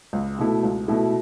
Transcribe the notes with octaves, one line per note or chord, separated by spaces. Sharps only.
C#2
B2 A3 E4
C#2
B2 A3 E4